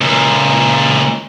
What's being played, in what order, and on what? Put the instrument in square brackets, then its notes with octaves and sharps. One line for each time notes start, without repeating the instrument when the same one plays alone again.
[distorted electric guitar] C#2 A#2